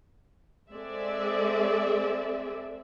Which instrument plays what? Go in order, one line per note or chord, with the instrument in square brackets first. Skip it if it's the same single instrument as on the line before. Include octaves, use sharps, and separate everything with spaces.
[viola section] G#3 C4 G#4 A4 D5 E5